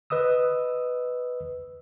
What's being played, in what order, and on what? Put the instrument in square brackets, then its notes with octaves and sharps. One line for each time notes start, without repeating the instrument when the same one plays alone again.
[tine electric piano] B4 D#5 D#6 E6